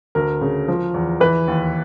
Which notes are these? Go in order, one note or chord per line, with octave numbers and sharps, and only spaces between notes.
D2 A#4
C#3
F3
E2
E3 B4
D#2